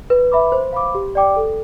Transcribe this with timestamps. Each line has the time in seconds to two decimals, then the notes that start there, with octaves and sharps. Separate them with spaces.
0.10 B4
0.32 E5 B5 D6
0.52 C5
0.73 F5 B5 D6
0.95 G4
1.15 D5 G5 D6
1.36 A4